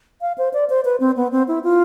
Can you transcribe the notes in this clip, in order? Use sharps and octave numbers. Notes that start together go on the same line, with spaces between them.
F5
C5
D5
C5
B4
C4
B3
C4
E4
F4